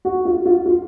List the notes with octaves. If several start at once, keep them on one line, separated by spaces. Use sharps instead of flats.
F#4
F4
F4
F4